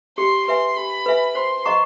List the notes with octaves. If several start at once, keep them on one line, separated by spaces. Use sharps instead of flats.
G4 C6
B4 E5 G#5 C6
G4 B5
B4 E5 G#5
C5 C6
D#5 F#5 A#5 C#6